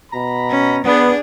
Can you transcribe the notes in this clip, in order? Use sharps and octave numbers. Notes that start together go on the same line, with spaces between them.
B2 A#5 B5
C#4
B3 D4 G#4